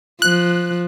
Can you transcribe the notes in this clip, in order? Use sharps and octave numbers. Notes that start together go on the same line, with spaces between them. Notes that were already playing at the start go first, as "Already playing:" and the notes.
F3 F#6